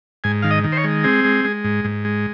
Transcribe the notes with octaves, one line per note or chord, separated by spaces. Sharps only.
G#2 G#5
D#3 F5
D#5
D#3
C5
C#5
G#3
C4 G#4
G#3
G#3
G#2
G#2
G#3